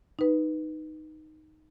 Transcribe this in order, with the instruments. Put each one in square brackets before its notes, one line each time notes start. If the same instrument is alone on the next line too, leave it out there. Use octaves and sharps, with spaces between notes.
[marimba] D#4 B4